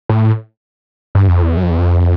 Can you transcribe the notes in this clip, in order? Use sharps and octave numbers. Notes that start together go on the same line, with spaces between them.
A2
G2
F2
E2
F#2
F2
E2
F2